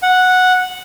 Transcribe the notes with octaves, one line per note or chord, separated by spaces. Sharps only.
F#5